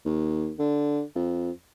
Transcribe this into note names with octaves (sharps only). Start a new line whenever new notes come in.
D#2
D3
F2